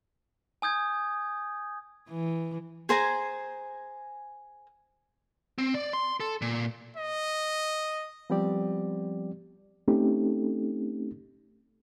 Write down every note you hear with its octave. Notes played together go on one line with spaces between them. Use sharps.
G#5 D#6 G6 G#6
E3
G#4 C5 G#5 A#5
C4
D5
C6
A4
A#2
D#5
F3 G3 B3 C4 G4 D5
A3 C4 C#4 D#4 G4 A4